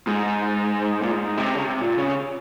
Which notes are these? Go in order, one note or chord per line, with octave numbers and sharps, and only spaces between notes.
G#2
A#2
G#2
C3
C#3
C3
A#2
C#3